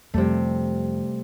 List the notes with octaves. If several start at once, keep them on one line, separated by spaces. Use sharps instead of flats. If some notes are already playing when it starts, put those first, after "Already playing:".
F2 C3 G3 A3